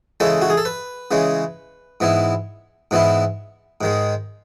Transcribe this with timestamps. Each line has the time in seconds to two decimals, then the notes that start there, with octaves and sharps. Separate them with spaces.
0.20 C#3 E3 G#3 C#4 A4
0.42 F#4
0.50 G#4
0.58 A4
0.65 B4
1.11 C#3 E3 G#3 C#4
2.00 G#2 E3 B3 E4
2.91 G#2 E3 B3 E4
3.81 G#2 D#3 G#3